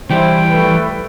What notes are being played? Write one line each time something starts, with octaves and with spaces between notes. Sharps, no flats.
E3 G3 E4 C5 G5
A3 B4